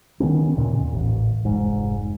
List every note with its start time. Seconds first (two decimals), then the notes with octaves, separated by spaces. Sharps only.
0.20 D#3 F3 B3 C#4
0.57 D#2 A#2 C#3
0.93 A1
1.45 F1 G#2